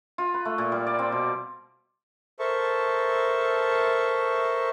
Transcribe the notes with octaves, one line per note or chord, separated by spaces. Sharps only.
F4
B4
A3
A#2
G3
D5
C4
B2
A4 A#4 C5 E5 A5 C#6